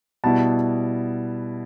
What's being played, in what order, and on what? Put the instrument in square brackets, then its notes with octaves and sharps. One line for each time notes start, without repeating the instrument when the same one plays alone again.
[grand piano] B2 G3 B3 E4 A5